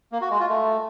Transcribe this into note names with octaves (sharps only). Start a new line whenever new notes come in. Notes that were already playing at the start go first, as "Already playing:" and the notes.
A#3
F#4
G#3
F4
A3